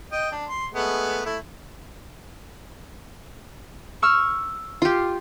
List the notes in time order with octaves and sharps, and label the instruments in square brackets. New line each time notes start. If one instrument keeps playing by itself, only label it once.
[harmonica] D#5 G5
D4
C6
G#3 A3 B3
A3 E4
[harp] C#6 E6 F6
[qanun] F4 G4